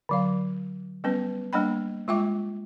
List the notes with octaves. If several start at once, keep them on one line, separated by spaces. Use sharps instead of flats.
D3 F#3 F5
G3 B3 C#4 B4
G3 A#3 D4 D#5 G5 B5
G#3 F4 E5 G5 D6